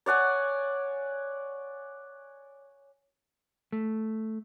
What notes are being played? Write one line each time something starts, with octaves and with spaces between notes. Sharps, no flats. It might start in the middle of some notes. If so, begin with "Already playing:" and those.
C#5 D5 F#5 G#5
A3